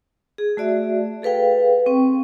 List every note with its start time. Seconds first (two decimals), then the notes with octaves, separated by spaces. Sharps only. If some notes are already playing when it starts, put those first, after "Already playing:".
0.38 G#4
0.57 A3 F#4 D5 E5
1.22 G#4 A4 B4 F5 G5
1.86 C4 G5 C#6